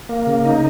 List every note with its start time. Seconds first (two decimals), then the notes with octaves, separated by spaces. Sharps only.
0.09 A#3
0.27 C#3
0.45 D#4